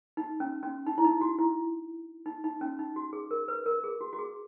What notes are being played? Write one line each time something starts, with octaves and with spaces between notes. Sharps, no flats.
D#4
C#4
C#4
D#4
E4
D#4
F#4
E4
D#4
D#4
C#4
D#4
F#4
G#4
A#4
B4
A#4
G#4
F#4
F#4
G#4